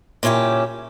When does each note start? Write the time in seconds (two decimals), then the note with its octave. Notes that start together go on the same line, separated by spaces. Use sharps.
0.23 A#2 C#3 C#4 E4 G4